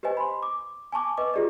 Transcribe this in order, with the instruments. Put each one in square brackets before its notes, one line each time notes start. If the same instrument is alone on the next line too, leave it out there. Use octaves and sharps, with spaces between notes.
[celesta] G4 B4 C5 D#5 G#5
B5 C6
D6
G#5 A5 C#6 D6
B4 D#5 D6
F4 G4 G#4 D5 D#5